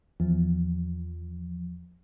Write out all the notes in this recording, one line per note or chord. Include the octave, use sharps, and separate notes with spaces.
E2 F3